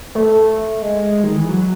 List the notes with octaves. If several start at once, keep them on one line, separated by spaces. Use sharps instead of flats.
A3
G#3
D#3
E3
F#3